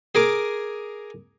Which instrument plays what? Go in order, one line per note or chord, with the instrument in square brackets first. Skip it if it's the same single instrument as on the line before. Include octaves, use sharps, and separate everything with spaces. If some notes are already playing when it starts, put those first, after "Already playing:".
[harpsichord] G#4 A#4 D6